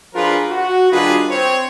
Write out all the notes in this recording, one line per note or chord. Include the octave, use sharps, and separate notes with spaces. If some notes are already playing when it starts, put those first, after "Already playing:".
F3 D4 F4 G#4 A#4 B4
F#4
D#3 G3 D4 F4 G#4 B4
C4 C5 C#5